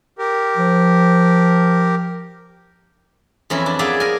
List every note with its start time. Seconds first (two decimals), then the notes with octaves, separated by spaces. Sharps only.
0.18 G4 A#4
0.57 F3
3.50 F2 E3 C#4 E4
3.66 D4
3.79 A#3 B3 G#4 D5 E5
4.00 A#4 G#5